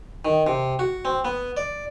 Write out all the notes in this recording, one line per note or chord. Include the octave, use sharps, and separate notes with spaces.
D#3
C3
F#4
C4
B3
D5